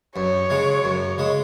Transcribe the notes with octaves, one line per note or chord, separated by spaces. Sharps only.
F#2 C#5
C#3 G#3
F#2
C#3 G#3